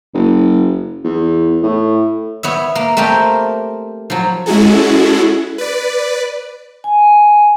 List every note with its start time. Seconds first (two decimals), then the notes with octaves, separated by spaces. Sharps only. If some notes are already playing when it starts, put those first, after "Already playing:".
0.14 F#1
1.04 E2
1.63 A2
2.43 B3 C#5 E5
2.75 A#3
2.97 A3 A#3 C4 G4 A#4
4.10 F3 F#3
4.46 G#3 C#4 E4 F#4 G#4 A4
5.58 B4 D5
6.84 G#5